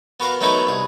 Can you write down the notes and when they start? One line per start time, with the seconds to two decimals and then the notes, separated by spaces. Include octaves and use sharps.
0.20 B3 F#4 A#4 F5 F#5
0.41 F#3 A3 B3 D#4 E4 A#4
0.67 C2 G#4